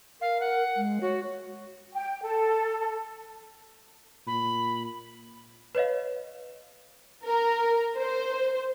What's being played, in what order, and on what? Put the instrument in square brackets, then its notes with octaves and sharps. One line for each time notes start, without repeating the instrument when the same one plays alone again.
[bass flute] A#4 [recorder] F5
[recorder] F#5
[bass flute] G#3
[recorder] F#4 [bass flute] C#5
[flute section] G5
A4
[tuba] A#2 [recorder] B5
[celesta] B4 C#5 D#5 F5
[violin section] A#4
C5